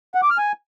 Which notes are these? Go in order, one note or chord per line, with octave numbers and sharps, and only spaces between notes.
F#5
D6
F6
G#5